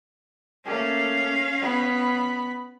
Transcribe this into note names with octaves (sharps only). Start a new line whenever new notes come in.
A3 A#3 C#4 F5
B3 B5